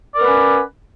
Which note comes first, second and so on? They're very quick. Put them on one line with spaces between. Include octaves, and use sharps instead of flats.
D5 A#4 B3 B4 C#4